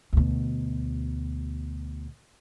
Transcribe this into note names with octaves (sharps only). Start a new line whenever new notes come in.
D2 B2